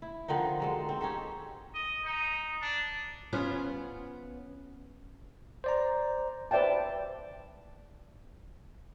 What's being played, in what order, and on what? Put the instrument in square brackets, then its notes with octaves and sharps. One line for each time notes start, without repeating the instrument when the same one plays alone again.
[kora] E4
D3 D#3 F3 D#4
F#3 G#3 A4
C4
C#4 D#4 G4 A4
[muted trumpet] D#5
D#4
D4
[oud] B3 C#4 F4
[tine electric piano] C5 D5 A#5
[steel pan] B4 C5 D5 E5 G5 A5